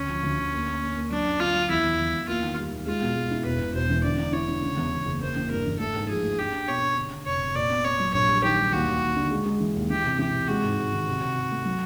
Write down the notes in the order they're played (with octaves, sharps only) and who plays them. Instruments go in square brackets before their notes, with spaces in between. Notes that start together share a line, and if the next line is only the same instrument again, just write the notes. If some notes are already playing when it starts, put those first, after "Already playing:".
Already playing: [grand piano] D2 [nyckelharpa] C#4
[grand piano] F3
D2
D2
A#3
A#3
A#3
A#3
[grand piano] F#3 [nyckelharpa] D4
[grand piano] F#2
[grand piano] D3 [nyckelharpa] F4
[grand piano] F#3
[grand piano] E2 [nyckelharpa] E4
[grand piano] E2
E2
E2
[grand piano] A#3 [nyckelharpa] F4
[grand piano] D#3
G3
D#2
[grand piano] G#3 [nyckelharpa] F4
[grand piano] B2
G#3
E4
[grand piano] E1 [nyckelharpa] B4
[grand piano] E1
[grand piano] E1 [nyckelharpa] C5
[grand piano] E3
[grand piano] D3 [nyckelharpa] D5
[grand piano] D3
[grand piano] E4 [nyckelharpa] C#5
[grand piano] D3
C#3
E2
E2
F#1
[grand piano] A#3 [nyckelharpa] C5
[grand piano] E3
[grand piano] G2 [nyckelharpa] A#4
[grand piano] E3
[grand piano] A3 [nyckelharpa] A4
[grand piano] G#2
[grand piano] F3 [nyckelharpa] G#4
[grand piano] A3
[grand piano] D4 [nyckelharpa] G4
[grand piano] D4
[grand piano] B2 [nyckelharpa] C#5
[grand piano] D4
D3
D3
[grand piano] F1 [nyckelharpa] C#5
[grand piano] F1
[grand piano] A#2 [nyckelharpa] D5
[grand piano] B3
[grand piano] B3 [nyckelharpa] C#5
[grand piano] F#3
[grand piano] A#1 [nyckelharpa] C#5
[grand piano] G3
[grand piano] D#3 [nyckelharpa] G4
[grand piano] G3
[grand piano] D#2 [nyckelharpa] F#4
[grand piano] D#2
D#2
D3
G#3
G#3
E3
D#2
[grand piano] E3 [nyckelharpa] G4
[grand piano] C3
[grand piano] E3 [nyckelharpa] G4
[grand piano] C3
[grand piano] G#3 [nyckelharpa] F#4
[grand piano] G#2
G#2
D#3
C3
C3
C3
A3
F#3